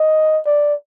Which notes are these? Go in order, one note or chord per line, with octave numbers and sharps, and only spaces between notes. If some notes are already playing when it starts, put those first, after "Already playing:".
Already playing: D#5
D5